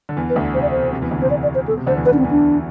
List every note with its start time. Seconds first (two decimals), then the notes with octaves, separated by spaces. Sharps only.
0.09 D3
0.17 E2 E3
0.30 B4
0.35 D2 D3
0.54 C3 C5
0.62 D5
0.71 B2 C5
0.92 C3
1.02 E2 E3
1.11 D2 D3
1.21 C3 C5
1.30 D5
1.43 D5
1.55 C5
1.68 B2 A4
1.77 C3
1.86 D2 D3 C5
1.96 E2 E3
2.05 D2 D3 B4
2.13 D4
2.18 C4
2.24 E2 E3
2.31 D4